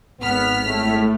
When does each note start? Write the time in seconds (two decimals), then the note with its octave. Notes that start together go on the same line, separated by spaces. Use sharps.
0.21 G#1 B3 F6 B6
0.65 A2 A3